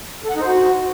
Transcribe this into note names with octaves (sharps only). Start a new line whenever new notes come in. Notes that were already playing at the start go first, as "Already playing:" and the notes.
A4
F#5
D#4
C5
F#4